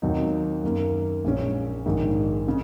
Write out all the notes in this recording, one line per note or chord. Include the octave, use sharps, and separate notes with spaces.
D#2 D#3 F#3 C4 D#4
F#2 D#3 A#3
A#1 A#2 G#3 C#4
A#1 G#2 D#3 G#3
C#3 G#3